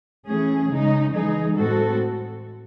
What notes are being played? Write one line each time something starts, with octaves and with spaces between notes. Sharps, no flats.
E3 A3 C#4 G#4
C#3 G#3 D#4
E3 G#3 D#4 G#4
A2 G#3 C4 F#4 A4